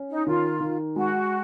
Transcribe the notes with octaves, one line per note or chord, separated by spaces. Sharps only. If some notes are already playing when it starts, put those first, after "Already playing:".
Already playing: C#4
D#4
D#3 F4
D#3
G#3 F#4